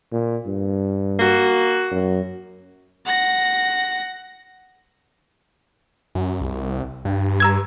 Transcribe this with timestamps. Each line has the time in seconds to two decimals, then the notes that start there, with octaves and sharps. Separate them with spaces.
0.12 A#2
0.46 G2
1.20 A#3 F#4
1.91 F#2
3.06 F#5 A#6
6.15 F#2
6.41 C2
7.05 G2
7.40 A#5 E6 G#6